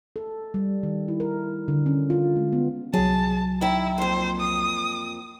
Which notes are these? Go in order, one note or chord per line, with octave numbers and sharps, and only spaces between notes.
A4
G3
D#3
E4
A#4
D3
C#4
F4
G#3
B3
C2 F#3 G#4 A5
D#3 E4 E5
F2 A#3 C5
D#6